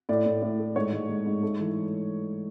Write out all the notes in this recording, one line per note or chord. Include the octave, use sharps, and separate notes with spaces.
A2 D5
A2
A2
A3
G#2 C#5
G#3
G#3
G#2
A3
E3